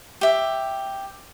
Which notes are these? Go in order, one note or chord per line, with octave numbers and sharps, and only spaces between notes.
G4 E5